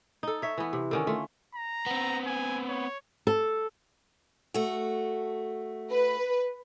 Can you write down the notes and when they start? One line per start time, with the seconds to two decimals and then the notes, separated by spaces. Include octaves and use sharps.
0.23 D#4 A4
0.42 C#5 E5
0.58 E3 B3
0.73 C3
0.91 D3 D#3 C#4
1.07 A3 F4
1.55 A#5
1.86 B3 C4
2.26 G#5
2.69 C#5
3.27 A4
4.54 A3 F#4
5.91 B4